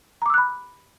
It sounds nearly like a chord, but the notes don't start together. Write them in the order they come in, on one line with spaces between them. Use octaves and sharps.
A#5 D6 E6 F#6 B5